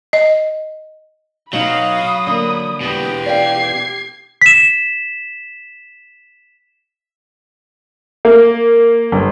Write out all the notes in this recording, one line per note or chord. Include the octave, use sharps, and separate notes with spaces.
D#5
B2 F#3 D#4 F5 B5 D#6
D3 A#3
B2 E3 G4
D5 F5 G5 G#6 C7
B6 E7
A#3
G1